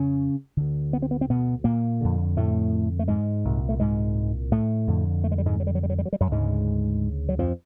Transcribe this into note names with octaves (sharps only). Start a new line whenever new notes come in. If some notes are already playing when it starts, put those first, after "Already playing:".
Already playing: F2 C#3 C#4
D2 D3
B3
C4
B3
C4
B2 B3
A#2 A#3
F2 D3
A2 A3
A3
G#2 G#3
C2 A#2
A3
G#2 G#3
A2 A3
F2 D3
A3
G#3
G3
G#2 G#3
F#3
G3
F#3
G3
F#3
G3
F#3
G3
F#2 F#3
D2 G#2 C#3 G#3
F#3
F2 F3